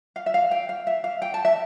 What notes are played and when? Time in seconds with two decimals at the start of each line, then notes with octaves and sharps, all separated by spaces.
0.16 F5
0.26 E5
0.34 F5
0.51 G5
0.69 F5
0.87 E5
1.04 F5
1.22 G5
1.34 A5
1.45 E5